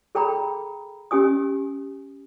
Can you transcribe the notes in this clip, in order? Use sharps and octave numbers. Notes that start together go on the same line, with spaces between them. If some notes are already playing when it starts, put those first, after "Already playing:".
G#4 A4 G5 A#5 B5
C#4 G4 G#5 D#6